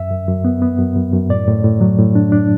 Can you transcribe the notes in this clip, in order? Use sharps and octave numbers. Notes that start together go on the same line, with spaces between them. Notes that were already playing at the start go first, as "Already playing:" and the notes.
Already playing: F#2 E5
F#2
F#2
B3
B3
F#2
F#2
F#2
A2 D5
A2
A2
F#3
A2
D4
D4